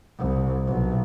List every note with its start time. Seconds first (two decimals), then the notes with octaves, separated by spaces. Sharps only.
0.19 C2
0.67 B1